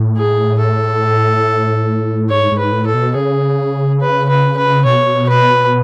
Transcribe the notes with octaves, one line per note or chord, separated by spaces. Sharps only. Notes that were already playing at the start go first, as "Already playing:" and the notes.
Already playing: A2
G#4
A4
G#2 C#5
G#2
B4
A2
A4
B2
C#3 G#4
B4
B4
B4
B2 C#5
B4